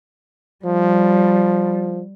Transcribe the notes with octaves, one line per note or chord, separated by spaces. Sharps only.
F3 G3